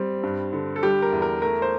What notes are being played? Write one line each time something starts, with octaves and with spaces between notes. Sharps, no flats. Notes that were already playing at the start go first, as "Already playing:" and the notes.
Already playing: G3 C4
G2
D3
A4
G3 G4
A#4
E2
A#4
A3 A#4
C5